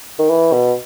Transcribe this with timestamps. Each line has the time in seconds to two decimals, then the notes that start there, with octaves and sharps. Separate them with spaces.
0.19 D#3
0.30 E3
0.53 B2